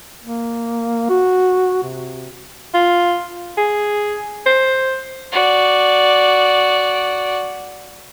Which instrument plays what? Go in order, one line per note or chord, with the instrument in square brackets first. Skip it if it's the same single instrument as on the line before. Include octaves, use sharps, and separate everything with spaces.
[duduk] A#3
F#4
C3
[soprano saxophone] F4
G#4
C5
[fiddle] F#4 D5